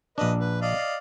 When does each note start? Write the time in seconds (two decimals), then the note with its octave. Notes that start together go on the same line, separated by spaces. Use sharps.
0.18 A#1 D4 B4 D#5
0.40 B4
0.62 D5 D#5 F5